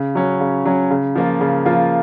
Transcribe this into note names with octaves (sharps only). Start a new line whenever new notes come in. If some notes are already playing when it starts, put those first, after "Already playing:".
Already playing: C#3
F#3 C#4
C#3
F#3 C#4
C#3
F3 A#3 F4
C#3
F3 A#3 F4